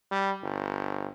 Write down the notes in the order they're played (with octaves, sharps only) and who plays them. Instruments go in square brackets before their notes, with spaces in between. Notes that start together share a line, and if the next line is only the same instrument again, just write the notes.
[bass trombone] G3
G1